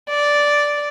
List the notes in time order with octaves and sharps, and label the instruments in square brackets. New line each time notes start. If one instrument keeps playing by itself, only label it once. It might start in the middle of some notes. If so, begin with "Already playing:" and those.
[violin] D5